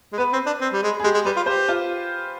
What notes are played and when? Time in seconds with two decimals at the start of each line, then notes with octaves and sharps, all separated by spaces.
0.13 G#3
0.18 B3 B4
0.33 C4
0.46 D4
0.61 C4
0.73 G3
0.83 G#3
1.00 G#4
1.04 G#3 G4
1.14 G#3
1.25 G3 B4
1.36 F4
1.46 G4 C5
1.69 F4